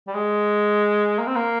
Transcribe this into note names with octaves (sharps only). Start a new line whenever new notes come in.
G3
G#3
A#3
C4
A#3